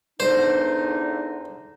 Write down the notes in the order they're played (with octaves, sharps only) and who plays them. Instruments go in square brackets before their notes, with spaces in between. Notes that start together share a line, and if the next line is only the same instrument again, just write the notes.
[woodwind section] E2 D3 D#4 [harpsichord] C5